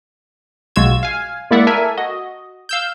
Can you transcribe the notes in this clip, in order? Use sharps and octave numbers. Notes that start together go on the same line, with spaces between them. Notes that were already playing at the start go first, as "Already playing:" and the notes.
B1 G#3 F4 F#4 E6 G#6
F5 G#5
G#3 A#3 E4 D5 E5 F#5
A4 A#4 E5 G#5
F#4 D#5
F5 E6 G6